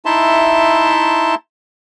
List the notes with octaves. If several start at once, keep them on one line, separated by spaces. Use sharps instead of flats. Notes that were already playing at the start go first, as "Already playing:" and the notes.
D#4 E4 E5 A5 C6